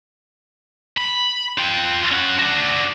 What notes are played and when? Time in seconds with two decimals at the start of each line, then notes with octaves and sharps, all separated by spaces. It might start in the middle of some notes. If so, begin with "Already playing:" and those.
0.97 B5
1.58 F4 G5
2.12 C#4 F#5
2.39 D4 F#4